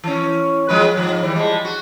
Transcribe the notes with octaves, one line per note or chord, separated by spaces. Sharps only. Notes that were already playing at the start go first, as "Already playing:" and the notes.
E3 C#4
F3 G#3 B4
G#2 F3
E3 G3
F3 G3 G#3
F#4